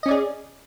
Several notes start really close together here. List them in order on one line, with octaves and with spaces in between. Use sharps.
D#5 C#4 D5 G#4